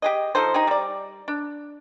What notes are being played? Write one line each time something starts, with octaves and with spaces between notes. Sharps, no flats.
G4 G#4 D#5
F3 D#4 A4 C5
D#4 G4 G#4
G3 D5
D4